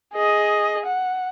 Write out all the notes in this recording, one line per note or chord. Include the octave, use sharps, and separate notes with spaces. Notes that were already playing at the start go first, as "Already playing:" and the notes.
G#4 D#5
F#5